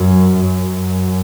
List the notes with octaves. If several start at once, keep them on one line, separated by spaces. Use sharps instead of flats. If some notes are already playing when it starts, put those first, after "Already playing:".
Already playing: F#2
F#2